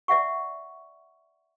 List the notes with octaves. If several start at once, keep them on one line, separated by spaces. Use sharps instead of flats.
D5 E5 F#5 C#6